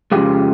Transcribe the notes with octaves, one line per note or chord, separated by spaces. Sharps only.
F2 C#3 E3 G#3 F4 G4